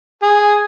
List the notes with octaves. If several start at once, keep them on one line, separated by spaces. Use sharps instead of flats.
G#4